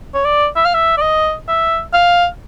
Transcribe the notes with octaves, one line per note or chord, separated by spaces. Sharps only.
C#5
D5
E5
F5
E5
D5
D#5
E5
F5